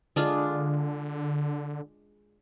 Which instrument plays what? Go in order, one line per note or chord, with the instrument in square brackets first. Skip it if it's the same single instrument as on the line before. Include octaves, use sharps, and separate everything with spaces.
[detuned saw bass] D3 [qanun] G#3 D4 F4